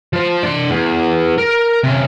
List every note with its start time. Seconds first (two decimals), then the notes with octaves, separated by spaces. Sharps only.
0.13 F3 C5
0.43 D4 C6
0.70 E2
1.38 A#4
1.84 C3 C#4